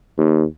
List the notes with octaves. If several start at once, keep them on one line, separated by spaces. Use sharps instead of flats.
D#2